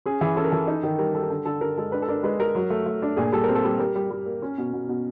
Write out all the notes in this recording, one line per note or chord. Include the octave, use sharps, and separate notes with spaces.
C#4 G#4
E3 G#4
C#4 A4
A#4
E3 A4
D#4
D#3
G3 A#4
G3 A4
A#4
D3 A4
D3 A4
D3 A#4
G#3 A4
D4 B4
A4
D4 A#4
G#3 B4
G#3 A#4
F#3
A3
A3
D4
A#2 G#4
G3 A4
C4 A#4
A4
G3
G3 A#4
G3
G3
A#3
C#4
B2
B2
B2